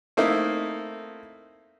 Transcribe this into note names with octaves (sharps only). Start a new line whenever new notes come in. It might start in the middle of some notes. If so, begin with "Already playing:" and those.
A3 A#3 C4 D#4 E4